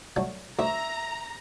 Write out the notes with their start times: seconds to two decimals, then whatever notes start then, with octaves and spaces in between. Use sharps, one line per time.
0.16 D3 F#3 A3
0.59 D2 E5 A#5